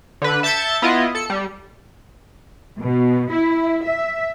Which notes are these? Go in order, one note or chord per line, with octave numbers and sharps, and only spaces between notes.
D3 B4
E5 A5 G6 A6 C#7
B3 E4 F4 D#5
A4 C#7
G3
B2
E4
E5